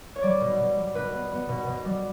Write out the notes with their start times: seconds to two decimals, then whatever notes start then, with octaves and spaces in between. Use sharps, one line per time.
0.16 C#5
0.22 G3 D5
0.41 B2
0.60 B2
0.78 G3
0.95 B2 B4
1.13 B3
1.32 B3
1.49 B2
1.67 B2
1.85 G3